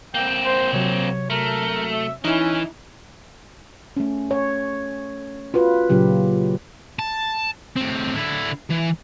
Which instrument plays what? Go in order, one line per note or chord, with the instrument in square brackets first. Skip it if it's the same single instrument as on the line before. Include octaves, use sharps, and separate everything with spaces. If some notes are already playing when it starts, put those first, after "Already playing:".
[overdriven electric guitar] A#3 C4 [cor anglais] G5
[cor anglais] C5
[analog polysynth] C3 F#3 [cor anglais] C#5
[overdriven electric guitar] A3 [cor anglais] A#4
[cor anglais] E5
[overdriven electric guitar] E3 [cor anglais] C#4 [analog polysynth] D#4 E4
[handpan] A3 C#4
C#5
F4 F#4 B4
A#2 C#3 F#3 G4
[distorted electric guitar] A5
A2 C4
D3 E4
E3